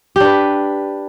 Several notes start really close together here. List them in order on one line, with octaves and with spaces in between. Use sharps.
G4 D4 B4